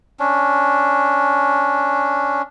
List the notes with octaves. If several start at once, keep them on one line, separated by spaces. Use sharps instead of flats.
C#4 D4